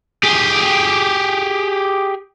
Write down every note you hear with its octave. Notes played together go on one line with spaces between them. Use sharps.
G4 G#4